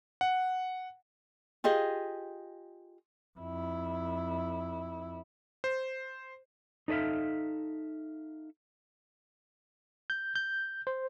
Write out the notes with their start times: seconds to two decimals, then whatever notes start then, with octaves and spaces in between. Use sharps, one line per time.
0.21 F#5
1.64 F4 G4 G#4 D#5
3.39 F2 E4
5.64 C5
6.88 D#4 A4 D5 E5 F5
10.10 G6
10.35 G6
10.87 C5